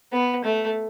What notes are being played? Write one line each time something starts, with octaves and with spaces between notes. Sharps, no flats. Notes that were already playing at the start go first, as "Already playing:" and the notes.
B3
A3